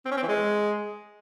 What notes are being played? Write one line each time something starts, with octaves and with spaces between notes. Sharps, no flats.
C4
C#4
C4
E3
G#3